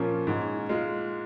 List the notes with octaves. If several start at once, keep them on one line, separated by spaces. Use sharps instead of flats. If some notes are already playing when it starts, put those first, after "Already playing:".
Already playing: A#2 F3 A#3 C#4
G#2
G#3 F4